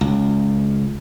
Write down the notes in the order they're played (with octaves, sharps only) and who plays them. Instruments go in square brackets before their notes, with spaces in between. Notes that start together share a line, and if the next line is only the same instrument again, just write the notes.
[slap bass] C#2